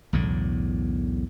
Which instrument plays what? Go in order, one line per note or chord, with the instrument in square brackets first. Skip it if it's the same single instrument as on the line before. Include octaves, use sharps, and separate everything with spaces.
[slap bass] B1 E2 A2 D3